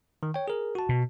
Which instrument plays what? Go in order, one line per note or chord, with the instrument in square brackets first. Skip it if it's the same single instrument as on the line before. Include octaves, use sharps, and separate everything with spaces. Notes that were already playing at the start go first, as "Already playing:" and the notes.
[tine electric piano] D#3
C#5 G5
G#4 A#4
F#4 A5
[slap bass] B2